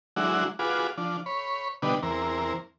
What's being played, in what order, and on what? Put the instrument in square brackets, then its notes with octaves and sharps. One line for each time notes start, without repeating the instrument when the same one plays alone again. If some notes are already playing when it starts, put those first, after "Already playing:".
[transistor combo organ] F#3 G#3 D4 E4 F#4
F4 F#4 G#4 B4 D6
F3 D4
C#5 B5
B2 D3 G3 D4 B4 D#5
E2 C4 A#4